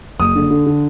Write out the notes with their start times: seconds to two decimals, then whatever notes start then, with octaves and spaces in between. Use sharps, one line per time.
0.19 F#1 D#6
0.36 D3
0.51 D3
0.66 D3